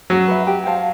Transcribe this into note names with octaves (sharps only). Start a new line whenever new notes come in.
F#3 F#4
B4 E5
G4
C5 F5 A5